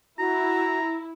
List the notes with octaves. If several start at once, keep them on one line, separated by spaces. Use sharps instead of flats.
E4 F#4 A#5